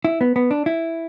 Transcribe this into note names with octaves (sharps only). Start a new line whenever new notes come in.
E4
B3
B3
D4
E4